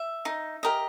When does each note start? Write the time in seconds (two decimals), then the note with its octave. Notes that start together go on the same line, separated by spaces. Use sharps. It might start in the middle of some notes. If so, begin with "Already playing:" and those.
Already playing: E5
0.25 D#4
0.63 G4 A#4 D#5